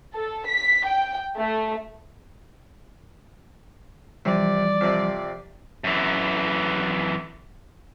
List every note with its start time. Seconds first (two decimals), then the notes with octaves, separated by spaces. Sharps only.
0.15 A4
0.48 B6
0.86 G5
1.37 A3
4.25 C3 E3 F3 G3 D5
4.81 F2 C3
5.84 F#2 E3